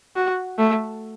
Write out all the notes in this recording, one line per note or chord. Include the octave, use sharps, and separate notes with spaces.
F#4
A3